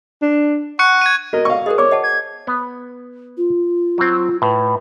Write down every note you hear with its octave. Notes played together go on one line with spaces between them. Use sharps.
D4
F#5 C#6 F#6 C#7
G#6 D#7
F#4 A#4 D#5
D5 F5 C#6
G#4 A#4 C5 D#5
G#4 C#5 D5 C#6 D6
D#5 F#5 A5
G#6
B3
F4
F#3 C4
A2 B4